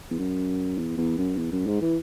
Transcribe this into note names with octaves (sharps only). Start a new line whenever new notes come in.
E2
F#2
E2
E2
F#2
E2
F#2
G#2
E3